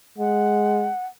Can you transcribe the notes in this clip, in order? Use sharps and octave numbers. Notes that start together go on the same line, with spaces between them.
G#3 F#5